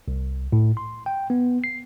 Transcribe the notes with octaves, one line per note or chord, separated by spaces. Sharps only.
C2
A2
C6
G5
B3
C7